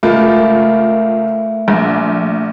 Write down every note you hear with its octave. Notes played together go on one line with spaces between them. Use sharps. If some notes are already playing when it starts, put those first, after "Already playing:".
C#2 A3 F4 A#4
A#1